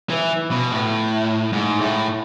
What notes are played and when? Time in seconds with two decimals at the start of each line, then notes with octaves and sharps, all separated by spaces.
0.10 E3
0.51 B2
0.72 A2
1.53 G#2
1.81 A2